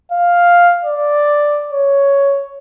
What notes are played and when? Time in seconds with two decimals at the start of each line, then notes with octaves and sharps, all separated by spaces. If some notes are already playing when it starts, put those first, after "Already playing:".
0.12 F5
0.85 D5
1.72 C#5